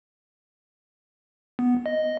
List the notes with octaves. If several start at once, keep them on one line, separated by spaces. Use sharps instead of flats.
B3
D#5